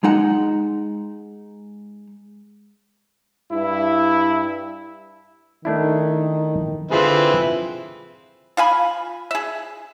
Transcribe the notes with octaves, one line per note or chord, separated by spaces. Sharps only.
G#3 D#4 F#5
G2 E4
D#3 A3 D4 E4
D3 C4 E4 F4 G#4 B4
F4 F5 G#5 B5
G#4 E5